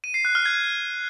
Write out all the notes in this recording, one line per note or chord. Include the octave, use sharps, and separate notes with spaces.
D#7
C7
F#6
F6
G#6